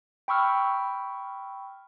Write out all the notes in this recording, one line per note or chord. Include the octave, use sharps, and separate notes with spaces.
G5 B5 C#6 E6 F6